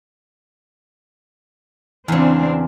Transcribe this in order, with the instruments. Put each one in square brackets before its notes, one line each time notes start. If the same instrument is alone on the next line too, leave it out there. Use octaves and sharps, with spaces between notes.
[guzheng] E2 C#3 [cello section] C4 D4